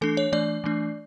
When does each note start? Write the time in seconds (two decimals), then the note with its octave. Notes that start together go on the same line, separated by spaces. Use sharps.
0.01 E3 A3 D4 A4
0.17 C#5
0.32 E3 A3 D4 D5
0.64 E3 A3 D4